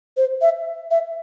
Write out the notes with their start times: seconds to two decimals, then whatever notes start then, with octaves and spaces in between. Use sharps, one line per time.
0.17 C5
0.41 E5
0.91 E5